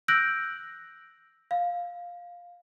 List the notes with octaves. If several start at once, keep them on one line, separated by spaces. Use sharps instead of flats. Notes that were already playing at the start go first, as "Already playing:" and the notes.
E6 F#6 G6 A#6 D7 F#7
F5